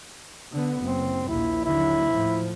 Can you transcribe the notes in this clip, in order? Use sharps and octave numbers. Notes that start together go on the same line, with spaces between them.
D3 B3
F#1 C4
A#1 D#2 E4
D#2 D3 F#3 E4
A2 F3